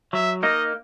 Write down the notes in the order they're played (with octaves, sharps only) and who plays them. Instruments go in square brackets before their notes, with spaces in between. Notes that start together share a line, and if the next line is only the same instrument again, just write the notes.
[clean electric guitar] F#3 [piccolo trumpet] E5
[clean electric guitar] A#3 D#4 [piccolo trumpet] D#5